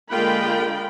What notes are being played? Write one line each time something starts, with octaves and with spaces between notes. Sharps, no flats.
D3 G#3 A#3 F4 G5 B5